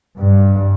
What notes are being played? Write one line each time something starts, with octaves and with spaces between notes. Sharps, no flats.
G2